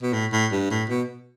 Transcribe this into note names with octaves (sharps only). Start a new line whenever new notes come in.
B2
A2
A2
G2
A2
B2